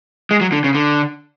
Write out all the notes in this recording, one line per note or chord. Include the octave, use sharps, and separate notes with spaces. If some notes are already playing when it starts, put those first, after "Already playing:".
G#3
F#3
D3
C#3
D3